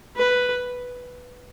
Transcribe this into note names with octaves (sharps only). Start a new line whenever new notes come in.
B4